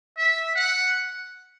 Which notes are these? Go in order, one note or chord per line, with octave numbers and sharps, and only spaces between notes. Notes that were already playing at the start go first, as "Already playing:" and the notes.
E5
F#5